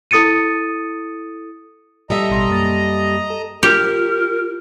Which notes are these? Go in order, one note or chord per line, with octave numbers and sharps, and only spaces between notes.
E4 A4 D#6 A6 C#7 D#7
G3 A4 D#5 E5 A#5
A1 B2 C6
F#2 A#3 A6
A4
F4 G4 A#4